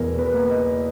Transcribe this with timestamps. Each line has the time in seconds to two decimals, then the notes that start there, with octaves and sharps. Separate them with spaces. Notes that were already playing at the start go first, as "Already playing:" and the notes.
Already playing: E2 B2 E4 A#4 B4
0.19 B4
0.34 A#3
0.50 D#5